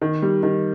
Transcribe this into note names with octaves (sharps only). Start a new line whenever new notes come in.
D#3
G3
D#3